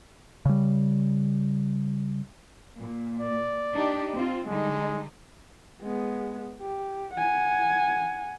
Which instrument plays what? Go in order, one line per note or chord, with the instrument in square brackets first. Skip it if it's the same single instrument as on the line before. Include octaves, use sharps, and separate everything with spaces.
[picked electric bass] C#3 G3
[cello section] A#2
[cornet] D5
[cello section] D4 D#4 G4
C4 F4
[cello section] D3 G3 D#4 [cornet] G#3
[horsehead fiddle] G#3 B3
G4
F#5 G#5